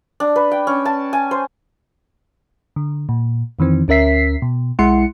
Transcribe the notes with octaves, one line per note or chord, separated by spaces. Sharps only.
D4
B4
G5
C#4
A5
G#5
C5
D3
A#2
F2 D#3 E3 C4
D2 C#4 A#4 E5 B6 C7
B2
B1 G#3 E4 F#5 C6 C#7